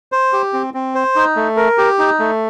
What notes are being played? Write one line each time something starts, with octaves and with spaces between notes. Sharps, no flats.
C5
G4
C4
C4
C5
D#4
A3
A#4
G4
D#4
A3